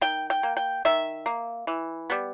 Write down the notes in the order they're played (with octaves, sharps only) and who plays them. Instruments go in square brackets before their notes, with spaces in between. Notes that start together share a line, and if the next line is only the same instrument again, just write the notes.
[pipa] D#3 G5
G5
A#3
G5
D#3 E5
A#3
E3
G3 B3